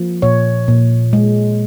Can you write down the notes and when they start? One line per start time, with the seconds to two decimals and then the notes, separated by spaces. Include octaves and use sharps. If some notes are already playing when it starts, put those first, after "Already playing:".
Already playing: F3 A#3
0.22 A#2 C#5
0.68 A#2
1.13 G#3